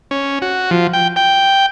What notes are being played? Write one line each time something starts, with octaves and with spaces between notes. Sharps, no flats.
C#4
F#4
F3
G5
G5